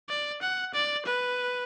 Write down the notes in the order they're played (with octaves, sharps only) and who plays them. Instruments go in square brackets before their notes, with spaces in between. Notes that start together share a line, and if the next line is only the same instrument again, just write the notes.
[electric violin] D5
F#5
D5
B4